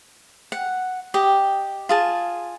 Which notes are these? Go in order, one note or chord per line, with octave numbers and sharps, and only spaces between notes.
F#5
G4 D#5
F4 G#4 A5